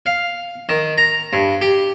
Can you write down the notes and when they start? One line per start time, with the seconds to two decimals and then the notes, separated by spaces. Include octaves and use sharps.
0.06 F5
0.69 D#3
0.98 A#5
1.33 G2
1.61 G4